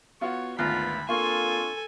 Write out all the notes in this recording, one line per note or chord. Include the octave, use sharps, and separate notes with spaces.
B3 F4 F#4 C#5
G#1 D2 B3 F4 B5 F#6 A6 A#6
A#3 C4 D4 F4 A4 G#5 C6 C#6